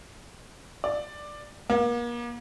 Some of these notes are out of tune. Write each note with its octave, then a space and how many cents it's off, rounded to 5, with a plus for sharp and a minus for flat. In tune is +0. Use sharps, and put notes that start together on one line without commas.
D5 +10
A#3 +40